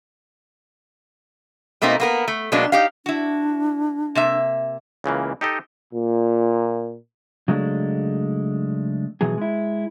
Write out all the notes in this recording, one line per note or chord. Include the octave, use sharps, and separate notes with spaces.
B2 A3 A#3 C4 D#4
A#3 B3 A#4
A3
B2 F#3 G#3 A#3 D4
D#4 G4 F5
D4 E4 F#4
C3 A#3 E5
C#2 C#3 E3 A#3
D#4 G4 A4 D#5
A#2
C#3 F#3 G#3 A3 D4
B2 E3 F#3 G#4
G#3 E4